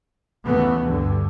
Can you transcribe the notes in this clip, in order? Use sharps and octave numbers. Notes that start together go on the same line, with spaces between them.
D#2 C#3 E3 A3 B3
D2 G2 D3